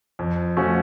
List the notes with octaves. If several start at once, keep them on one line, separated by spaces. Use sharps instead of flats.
F2
F3 A3 C#4 F#4